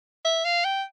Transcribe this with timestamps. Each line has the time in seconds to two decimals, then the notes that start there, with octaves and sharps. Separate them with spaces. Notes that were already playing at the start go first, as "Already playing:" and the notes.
0.25 E5
0.45 F5
0.65 G5